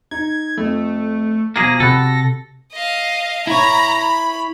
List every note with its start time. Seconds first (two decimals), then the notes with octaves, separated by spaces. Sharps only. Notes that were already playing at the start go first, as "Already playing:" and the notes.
0.11 D#4 G#6
0.57 F2 A3
1.56 B2 F3 A#3 G#4 A#6
1.80 C3 F#4 A4 B5 F#6
2.72 D#5 F5
3.47 E4 C#5 A#5 B5
3.98 B5